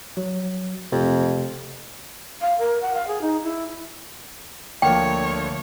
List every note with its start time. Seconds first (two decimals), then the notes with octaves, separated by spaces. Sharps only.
0.17 F#3
0.92 F2 C3 A3
2.41 F5
2.58 A#4
2.81 F#5
2.94 F5
3.08 G#4
3.22 D#4
3.43 E4
4.82 D2 F3 A#3 C#5 G5